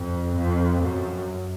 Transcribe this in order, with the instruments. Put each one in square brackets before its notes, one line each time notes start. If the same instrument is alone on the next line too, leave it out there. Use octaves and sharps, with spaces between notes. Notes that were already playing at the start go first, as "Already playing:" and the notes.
Already playing: [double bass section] F2
F2
F#2